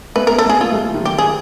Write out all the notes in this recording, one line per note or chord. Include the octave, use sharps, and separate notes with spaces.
A3 B3 B4
A#4
A3 B3
A4
A3 B3
G#4
G#3 A#3 F4
G3 A3
D#3 F3
G4
G#4